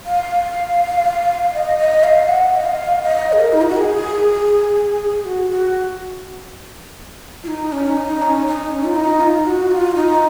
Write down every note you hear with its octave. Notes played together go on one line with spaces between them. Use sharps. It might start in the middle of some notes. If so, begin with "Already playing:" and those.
F5
D#5
D#5
F5
F#5
D#5
F5
D#5
G#4
A#4
D#4
F4
F#4
G#4
F#4
F#4
F4
D#4
C#4
D#4
C#4
D#4
C#4
F4
D#4
F4
F#4
F4
D#4